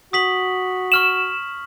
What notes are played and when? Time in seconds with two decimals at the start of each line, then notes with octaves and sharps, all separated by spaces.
0.13 F#4 D#6 B6 F#7
0.92 C#6 F6 E7 F#7